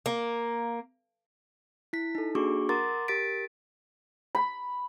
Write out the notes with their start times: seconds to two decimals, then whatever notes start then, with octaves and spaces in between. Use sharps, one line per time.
0.06 A#3
1.93 E4 B6
2.15 D#4 A4
2.35 A#3 D4 F#4 G#4 C#6 D6
2.69 A#4 F#5 A#5 C6 D6 A6
3.08 G4 A#4 A6 B6 D7
4.35 B5